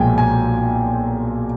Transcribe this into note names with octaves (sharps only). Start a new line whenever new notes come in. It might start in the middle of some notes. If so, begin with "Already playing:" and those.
Already playing: B1 A#2 F3 G#3 G5 G#5
G#5